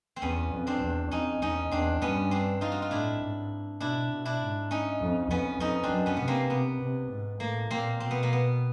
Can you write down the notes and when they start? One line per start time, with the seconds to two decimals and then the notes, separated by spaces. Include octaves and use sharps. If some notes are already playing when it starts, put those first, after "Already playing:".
0.16 C4
0.22 E2 B3 C#4
0.53 F2
0.67 C4 D4
0.82 E2
1.11 F2 C#4 D#4
1.42 E2 C#4 D#4
1.71 E2 C4 D4
2.02 G2 B3 C#4
2.31 C4 D4
2.61 D#4 F4
2.72 F#4
2.82 F4
2.91 A2 D4 E4
3.22 G#2
3.80 B2 D4 E4
4.12 B2
4.25 D4 E4
4.42 G#2
4.71 C#4 D#4
5.01 F2
5.30 F2 B3 C#4
5.60 F2 C#4 D#4
5.84 C4 D4
5.91 F#2
6.06 B3 C#4
6.17 C3 B3
6.28 A#3 C4
6.50 C3 B3
6.81 C3
7.10 G#2
7.40 A2 A#3
7.70 A#2 A#3 C4
8.00 B2 C4
8.11 B3
8.23 A#3
8.33 B3